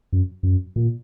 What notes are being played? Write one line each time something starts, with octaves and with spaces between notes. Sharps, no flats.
F#2
F#2
A#2